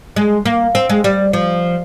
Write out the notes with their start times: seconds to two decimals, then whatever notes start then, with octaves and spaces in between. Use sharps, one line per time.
0.16 G#3
0.45 A#3
0.75 C4
0.89 G#3
1.04 G3
1.33 F3